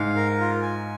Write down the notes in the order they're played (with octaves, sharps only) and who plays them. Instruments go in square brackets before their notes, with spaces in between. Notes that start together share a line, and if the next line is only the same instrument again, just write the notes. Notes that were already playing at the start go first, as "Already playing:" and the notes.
Already playing: [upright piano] G#2 [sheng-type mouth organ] F5
[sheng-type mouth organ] A#4
F4
G#5